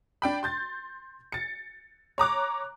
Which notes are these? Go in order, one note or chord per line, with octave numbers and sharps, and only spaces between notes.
D4 G5 B5
C6 G6 A6
A6 C#7
C#5 A#5 D6 F#6